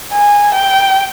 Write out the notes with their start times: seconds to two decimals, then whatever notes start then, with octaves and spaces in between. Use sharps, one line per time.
0.13 G#5
0.55 G5